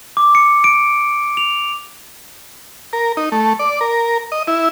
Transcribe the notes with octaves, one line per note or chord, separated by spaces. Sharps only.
D6
C#7
D7
F7
A#4
D#4
A3
D5
A#4
D#5
E4